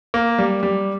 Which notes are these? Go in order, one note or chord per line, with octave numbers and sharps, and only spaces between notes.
A#3
G3
G3